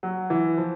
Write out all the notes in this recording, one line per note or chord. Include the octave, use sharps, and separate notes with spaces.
F#3
E3
F3